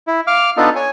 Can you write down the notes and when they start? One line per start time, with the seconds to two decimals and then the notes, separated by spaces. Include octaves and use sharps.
0.08 E4
0.27 F5 D6 F6
0.57 B3 D4 D#4 F4 A4
0.76 C#5 G#5